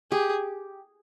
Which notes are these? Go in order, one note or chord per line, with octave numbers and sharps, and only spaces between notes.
G4 G#4